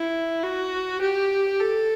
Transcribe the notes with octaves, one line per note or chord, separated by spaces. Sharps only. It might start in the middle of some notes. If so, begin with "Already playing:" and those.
Already playing: E4
F#4
G4
A4